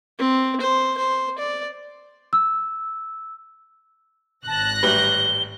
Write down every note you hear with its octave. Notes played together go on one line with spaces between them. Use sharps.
C4
C5
C5
D5
E6
G#1 A5 F#6 A#6
A1 G3 B4 G7